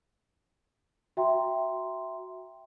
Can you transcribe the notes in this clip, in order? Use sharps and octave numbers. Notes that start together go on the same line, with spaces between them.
F#4 E5 G5 A#5 C6